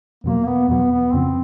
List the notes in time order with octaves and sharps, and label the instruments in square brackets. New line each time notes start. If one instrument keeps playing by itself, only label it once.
[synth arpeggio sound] E2 B2 F#3 [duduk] A#3
[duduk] B3
[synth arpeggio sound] E2 B2 F#3 [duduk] B3
[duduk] B3
[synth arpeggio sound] F2 C#3 F3 [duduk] C4